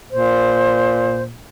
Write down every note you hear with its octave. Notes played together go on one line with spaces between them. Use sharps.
A#2 C5